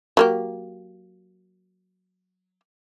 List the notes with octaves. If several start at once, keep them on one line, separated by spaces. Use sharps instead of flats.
F#3 A#3 G4